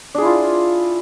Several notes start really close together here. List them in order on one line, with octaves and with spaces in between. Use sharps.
D4 G#4 E4 F4